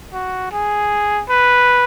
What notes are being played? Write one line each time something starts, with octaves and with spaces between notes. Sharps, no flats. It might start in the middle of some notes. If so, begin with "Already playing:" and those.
F#4
G#4
B4